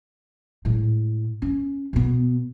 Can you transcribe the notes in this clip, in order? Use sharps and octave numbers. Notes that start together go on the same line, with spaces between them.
A2 G#3
C#4
B2 B3